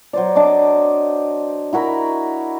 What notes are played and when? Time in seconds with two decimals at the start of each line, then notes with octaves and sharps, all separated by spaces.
0.13 F#3 C5 D5
0.35 D4 D#5 D6
1.73 E4 F#4 A#4 B5